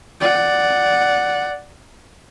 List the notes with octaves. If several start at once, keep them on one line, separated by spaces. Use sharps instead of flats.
D5 F#5